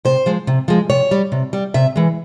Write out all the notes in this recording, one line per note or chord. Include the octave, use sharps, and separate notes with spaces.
C3 C5
F3 G#3
C3
F3 G#3
C3 C#5
G3
C3
G3
C3 E5
E3 G#3